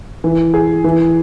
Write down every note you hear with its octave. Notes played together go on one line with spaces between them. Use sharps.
E3
G#4
E3